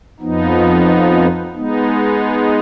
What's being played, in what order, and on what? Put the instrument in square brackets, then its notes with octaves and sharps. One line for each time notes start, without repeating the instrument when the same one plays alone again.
[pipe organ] F2 F3 B3 D#4
G#3 B3 D#4